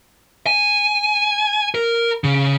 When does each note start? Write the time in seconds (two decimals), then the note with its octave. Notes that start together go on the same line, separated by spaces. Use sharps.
0.46 G#5
1.75 A#4
2.24 C#3